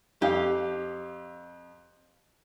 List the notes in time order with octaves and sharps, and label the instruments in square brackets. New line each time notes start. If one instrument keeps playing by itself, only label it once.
[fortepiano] F2 F5 [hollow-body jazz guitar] G4